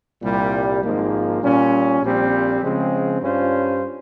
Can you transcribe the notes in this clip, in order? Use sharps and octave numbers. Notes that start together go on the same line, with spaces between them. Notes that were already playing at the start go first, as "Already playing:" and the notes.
C2 A#2 G3
G#1 G#2 F3 A#3
A#2 G3 C#4
A#1 A#2 G3 C4
C#3 F3 G#3 C4
G2 G3 C#4 F4 C5